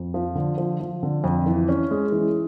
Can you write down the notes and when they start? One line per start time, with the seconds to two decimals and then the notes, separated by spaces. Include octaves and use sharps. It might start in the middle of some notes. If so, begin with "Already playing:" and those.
Already playing: F2
0.14 F3
0.35 D3
0.58 F3
0.80 F3
1.03 D3
1.24 F2
1.46 E3
1.69 C#4
1.91 G#3
2.12 E3